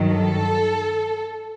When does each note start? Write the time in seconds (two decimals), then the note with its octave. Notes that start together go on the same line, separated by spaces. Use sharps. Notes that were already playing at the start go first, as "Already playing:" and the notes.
Already playing: G2 D#3 F#3
0.13 A4